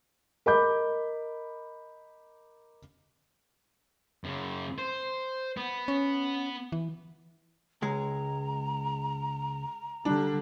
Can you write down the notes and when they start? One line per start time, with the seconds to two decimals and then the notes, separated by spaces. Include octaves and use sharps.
0.46 A#4 D#5 B5 D6 G6
4.24 F#2 C#3
4.78 C5
5.57 B3
5.88 C#4
6.72 E3
7.82 C#2 G#3 A#5
10.05 D3 G3 D4